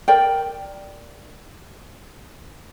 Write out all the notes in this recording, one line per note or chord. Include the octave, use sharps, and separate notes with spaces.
A#4 D5 G5